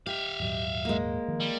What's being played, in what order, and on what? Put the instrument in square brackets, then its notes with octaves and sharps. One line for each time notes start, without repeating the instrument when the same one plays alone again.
[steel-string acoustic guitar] G4 [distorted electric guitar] E5 F5
[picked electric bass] D#1 G#2 F#3
[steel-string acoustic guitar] G#3 A#3
[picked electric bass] D#3 F3
[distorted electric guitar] G3